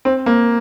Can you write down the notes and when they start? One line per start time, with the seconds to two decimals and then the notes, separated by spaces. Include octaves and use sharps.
0.05 C4
0.26 A#3